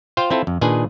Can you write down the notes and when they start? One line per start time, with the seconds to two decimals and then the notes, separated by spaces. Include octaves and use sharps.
0.17 F4 C5 F5 G5
0.30 C4 E4 F4 A4
0.47 F2
0.61 A#2 D#3 D4 G#4 B4 G#5